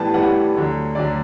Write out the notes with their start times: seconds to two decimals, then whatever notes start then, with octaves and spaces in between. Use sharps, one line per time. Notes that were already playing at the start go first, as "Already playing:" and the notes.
Already playing: A2 E3 G3 B3 A5
0.14 A2 E3 G3 B3 F#5
0.55 D2 D3 F#3
0.95 D2 D3 F#3 D5